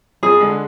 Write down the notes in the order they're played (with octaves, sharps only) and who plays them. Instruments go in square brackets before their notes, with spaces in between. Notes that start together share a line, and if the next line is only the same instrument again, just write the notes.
[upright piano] F2 [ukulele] G#4
[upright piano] D3 G#3